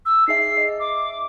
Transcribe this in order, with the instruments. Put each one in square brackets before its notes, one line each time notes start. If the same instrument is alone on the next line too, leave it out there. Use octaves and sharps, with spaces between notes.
[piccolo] E6
[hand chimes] D#4 G#4 E5 [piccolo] C7
[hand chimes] D#5 E5
[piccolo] D6